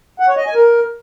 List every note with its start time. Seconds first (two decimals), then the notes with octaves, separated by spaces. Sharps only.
0.20 F#5
0.28 C#5
0.37 D#5
0.46 G#5
0.54 A#4